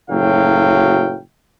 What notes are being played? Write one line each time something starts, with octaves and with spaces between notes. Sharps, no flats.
F#1 A2 F#3 F5 G5